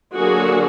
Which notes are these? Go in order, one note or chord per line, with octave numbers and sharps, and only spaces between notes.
D3 F#3 A#3 D4 F#4 G#4